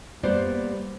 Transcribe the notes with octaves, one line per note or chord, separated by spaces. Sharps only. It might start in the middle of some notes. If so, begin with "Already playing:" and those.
G3 A#3 B3 C5 D5